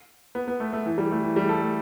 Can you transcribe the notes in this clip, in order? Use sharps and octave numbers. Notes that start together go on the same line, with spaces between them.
B3
B3
A3
A3
E3
G3
A3
E3
G3
A4
A3